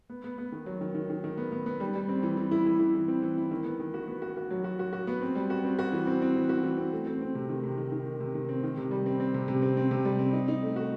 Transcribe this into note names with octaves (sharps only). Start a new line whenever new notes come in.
B3
B3
B3
D#3
F#3
D#3
D#3
D#3
D#3
B3
B3
B3
G3
G3
C4
E3
E3
E4
E3
E4
E3
C4
E3
E4
D#3
B3
D#3
F#4
B3
F#4
F#4
F#3
F#4
F#4
F#4
B3
C4
G3
F#4
C4
F#4
E3
C4
C4
E3
F#4
E3
C4
A3
C4
C4
C3
D#3
C3
D#3
D#3
D#3
C3
D#3
C4
D#3
C3
G3
C4
C4
C3
C3
C4
C4
C3
G3
C4
D#4
D#4
A3
F#4